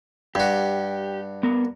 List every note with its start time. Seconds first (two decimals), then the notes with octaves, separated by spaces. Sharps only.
0.35 G2 F#4 G4
1.43 B3 A#4